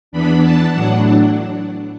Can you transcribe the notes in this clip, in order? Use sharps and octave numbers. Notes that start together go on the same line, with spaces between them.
E2 E3 B3 D4 B5
A5
A2 F#3 D4 F#5